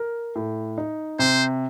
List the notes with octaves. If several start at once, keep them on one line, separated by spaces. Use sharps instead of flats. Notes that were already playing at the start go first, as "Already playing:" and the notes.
Already playing: A#4
A2
D#4
C3 C5